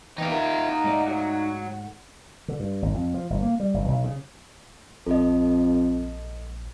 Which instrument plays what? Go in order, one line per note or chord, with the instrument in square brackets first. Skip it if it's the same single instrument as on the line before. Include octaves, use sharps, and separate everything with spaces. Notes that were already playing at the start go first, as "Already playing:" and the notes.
[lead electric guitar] E3 B3 [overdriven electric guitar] D#4 F5 [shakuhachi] G5
[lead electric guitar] F4 E5 [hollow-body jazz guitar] A#4 [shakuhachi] F#5
[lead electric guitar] D#5 A#5
[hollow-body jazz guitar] G#2 A3 D5
[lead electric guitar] F#4 C#5
[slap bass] D3
G2
G#1
F2
F3
G1
A#3
G3
G1
B1
C#3
[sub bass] A#1 [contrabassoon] F2 [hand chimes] A4 D#5